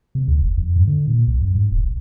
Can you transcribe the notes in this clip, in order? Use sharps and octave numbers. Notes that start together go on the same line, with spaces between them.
C3
D2
F1
F2
G2
D3
A#2
B1
F#2
G#2
D#1
A#1